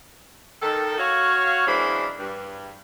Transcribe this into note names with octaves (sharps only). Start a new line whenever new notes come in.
D#3 A4
F#4 C#5 F5
F#2 E3 G#3 C4 D4 B5
G2